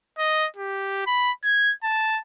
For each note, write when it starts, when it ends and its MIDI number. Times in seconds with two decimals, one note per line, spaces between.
0.19 0.47 75
0.57 1.02 67
1.07 1.31 83
1.44 1.73 92
1.84 2.19 81